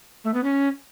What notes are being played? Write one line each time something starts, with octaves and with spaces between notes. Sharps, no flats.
A3
B3
C#4